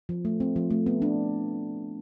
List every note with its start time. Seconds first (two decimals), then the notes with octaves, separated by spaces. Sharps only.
0.09 F3
0.25 A3
0.40 C4
0.56 F3
0.70 A3
0.86 B3
1.02 D4